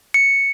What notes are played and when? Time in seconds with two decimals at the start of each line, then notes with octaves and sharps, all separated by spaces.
0.14 C#7